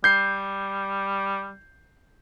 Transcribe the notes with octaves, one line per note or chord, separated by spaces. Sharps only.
G3 G6 C7